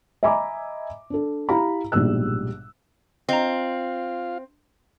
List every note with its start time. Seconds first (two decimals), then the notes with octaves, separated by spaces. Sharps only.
0.23 D#5 E5 G#5 A#5 B5 D6
1.10 D4 A4
1.49 E4 G4 F5 A#5 B5
1.92 A#1 G#2 B2 G3 E6 F#6
3.29 C4 F4 D#5 F5 A#5